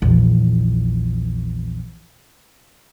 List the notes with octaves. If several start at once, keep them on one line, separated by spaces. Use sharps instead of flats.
A#1 E2